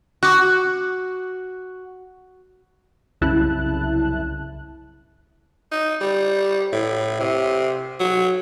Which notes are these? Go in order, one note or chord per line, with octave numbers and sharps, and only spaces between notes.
F#4 D6 F#6
C2 F#2 C#3 E4 A5 F#6
D#4
G3
A2
C3
F#3